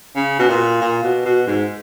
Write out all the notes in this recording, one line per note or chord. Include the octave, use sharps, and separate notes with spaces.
C#3
B2
A#2
A#2
B2
B2
G#2